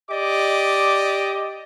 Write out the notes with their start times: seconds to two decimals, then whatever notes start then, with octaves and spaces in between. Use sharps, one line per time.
0.10 G4 D5 D#5 D6